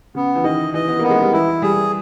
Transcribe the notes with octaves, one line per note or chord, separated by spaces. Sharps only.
C#3 B3
E3
D#3 D#5
E3 D#5
B3
A#3 B3
G#3
G3
E3 E4
G3 G#4